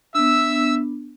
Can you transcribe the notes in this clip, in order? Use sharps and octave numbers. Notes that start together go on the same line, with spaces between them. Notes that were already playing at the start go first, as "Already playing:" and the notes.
B3 D4 E5 E6